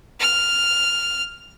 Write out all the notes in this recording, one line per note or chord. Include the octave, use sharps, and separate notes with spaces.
F6